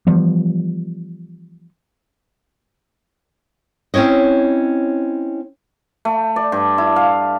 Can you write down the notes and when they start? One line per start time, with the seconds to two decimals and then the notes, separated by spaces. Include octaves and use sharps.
0.07 E3 F3 G3 B3
3.94 C4 C#4 E4 C#5 D#5
6.05 A3
6.36 D5
6.52 G2
6.78 E4
6.96 F5